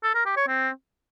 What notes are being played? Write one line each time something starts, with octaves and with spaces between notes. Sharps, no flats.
A4
A#4
G4
C#5
C4